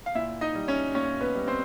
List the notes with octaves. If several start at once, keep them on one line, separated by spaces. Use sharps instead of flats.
F5
A#2 E4 E5
D#4 D#5
G3
C#4 C#5
A#2 C#4 C#5
B3 B4
G3
C4 C5